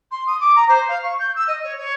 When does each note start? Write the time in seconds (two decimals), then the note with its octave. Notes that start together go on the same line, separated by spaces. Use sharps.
0.11 C6
0.27 D#6
0.40 D6
0.56 A#5
0.68 C5
0.88 F5
1.03 C#6
1.19 G6
1.36 E6
1.48 D#5
1.64 C#5
1.78 C#5